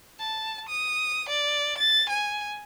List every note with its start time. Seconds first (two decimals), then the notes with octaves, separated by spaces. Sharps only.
0.20 A5
0.69 D#6
1.29 D5
1.79 A6
2.10 G#5